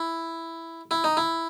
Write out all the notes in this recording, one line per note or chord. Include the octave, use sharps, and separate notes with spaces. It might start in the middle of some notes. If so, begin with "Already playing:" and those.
Already playing: E4
E4
D#4
E4